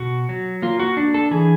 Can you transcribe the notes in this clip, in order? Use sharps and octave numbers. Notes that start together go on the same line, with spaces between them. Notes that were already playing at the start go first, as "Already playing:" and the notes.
Already playing: B2 F#4
F#3
A#3 F4
F#4
D4
A4
E3 G#4